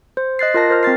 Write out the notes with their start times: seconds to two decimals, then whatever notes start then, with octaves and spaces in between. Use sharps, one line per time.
0.17 C5
0.39 D#5 F#6 A6 C7
0.54 F4 A#4 D#5 A5 A#6
0.70 A#4 C5 F6
0.83 C4 A#4 A6 C7